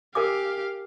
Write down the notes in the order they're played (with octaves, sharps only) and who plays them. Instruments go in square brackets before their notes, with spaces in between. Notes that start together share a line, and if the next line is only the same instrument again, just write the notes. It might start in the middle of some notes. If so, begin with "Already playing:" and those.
[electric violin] G4 F5 [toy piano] A#4 G#5 D6